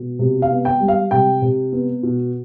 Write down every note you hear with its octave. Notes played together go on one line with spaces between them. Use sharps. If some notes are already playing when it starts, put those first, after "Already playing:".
Already playing: B2
C3
F5
B3
G5
G3
F5
C3 G5
C3
B3
B2